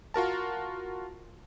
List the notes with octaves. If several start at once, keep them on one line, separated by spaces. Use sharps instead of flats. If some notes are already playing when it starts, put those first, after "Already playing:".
F4 F#4 A#4 A5